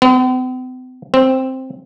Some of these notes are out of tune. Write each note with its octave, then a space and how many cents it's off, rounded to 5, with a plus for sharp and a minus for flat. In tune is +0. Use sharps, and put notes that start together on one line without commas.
C4 -45
C4 +5